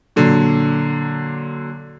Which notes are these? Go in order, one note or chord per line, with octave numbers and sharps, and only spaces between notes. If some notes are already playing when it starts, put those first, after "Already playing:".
A#2 D3 F#3